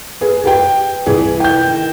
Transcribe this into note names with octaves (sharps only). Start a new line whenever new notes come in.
G#4 B4
G4 B4 G5
C2 E3 G#4
G5 G6
D#3